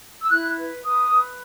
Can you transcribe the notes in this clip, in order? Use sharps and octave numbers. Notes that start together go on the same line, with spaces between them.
E6
E4 F#6
B4
B4 D#6
B4